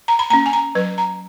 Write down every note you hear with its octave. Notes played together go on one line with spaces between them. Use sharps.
A#5
B5
A#3 C#4 A#5
G#5
A#5
F#3 B4
A#5